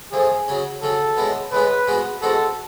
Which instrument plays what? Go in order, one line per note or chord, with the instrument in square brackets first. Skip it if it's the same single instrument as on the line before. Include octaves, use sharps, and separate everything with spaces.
[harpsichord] F2 F3 A3 [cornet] G#4
[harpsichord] C#3 F#3 C#4
[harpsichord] C#3 F#3 C#4 [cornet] A4
[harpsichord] A2 G#3 B3
[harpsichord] A2 G#3 B3 [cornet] B4
[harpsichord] G#2 G#3 B3 F#4
[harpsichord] G#2 G#3 B3 F#4 [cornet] A4